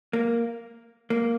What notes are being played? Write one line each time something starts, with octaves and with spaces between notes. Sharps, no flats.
A#3
A#3